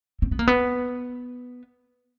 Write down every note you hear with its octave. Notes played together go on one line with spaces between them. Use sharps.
C4
B3
A#3
B3